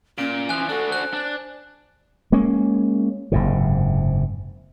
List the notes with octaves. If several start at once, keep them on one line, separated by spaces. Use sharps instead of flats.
A#2 C#4 D7
E3 F3 G#5 F#6
D4 F#4 A4
C5 F#6
D4
G#3 A#3 C#4
F#1 G#2 C3